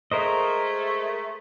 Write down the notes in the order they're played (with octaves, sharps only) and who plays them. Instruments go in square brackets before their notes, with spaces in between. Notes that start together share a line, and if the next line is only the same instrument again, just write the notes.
[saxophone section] G#3 A3 [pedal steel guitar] A#4 C5 D#5